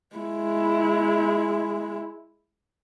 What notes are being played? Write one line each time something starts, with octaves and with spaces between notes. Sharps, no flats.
G#3 E4